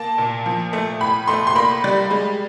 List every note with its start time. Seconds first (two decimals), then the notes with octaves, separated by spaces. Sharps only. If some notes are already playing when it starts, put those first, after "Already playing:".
Already playing: A#3 A5
0.18 A#2
0.46 F3
0.73 A3
1.00 A2 B5
1.28 A3 C6
1.47 C6
1.55 A#3 B5
1.84 G3
2.11 G#3